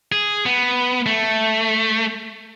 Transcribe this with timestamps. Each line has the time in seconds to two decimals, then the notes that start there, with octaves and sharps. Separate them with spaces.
0.12 G#4
0.46 B3
1.06 A3